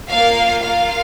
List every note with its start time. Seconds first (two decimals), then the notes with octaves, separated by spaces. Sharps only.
0.11 A#3 F4 F5
0.63 A#3 F4 F5